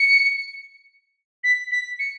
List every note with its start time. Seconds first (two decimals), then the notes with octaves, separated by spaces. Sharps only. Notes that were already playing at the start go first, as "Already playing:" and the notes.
Already playing: C#7
1.44 B6
1.71 B6
1.99 C#7